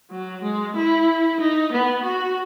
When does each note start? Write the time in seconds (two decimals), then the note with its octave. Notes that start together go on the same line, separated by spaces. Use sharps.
0.10 F#3
0.42 G#3
0.75 E4
1.40 D#4
1.72 B3
2.04 F#4